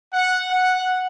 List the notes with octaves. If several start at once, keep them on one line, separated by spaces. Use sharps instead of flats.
F#5
F#5